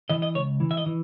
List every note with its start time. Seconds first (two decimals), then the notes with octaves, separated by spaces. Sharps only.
0.10 E3 D#5
0.22 D#5
0.35 C#2 C#5
0.60 E3
0.71 E5
0.77 D#5
0.86 E3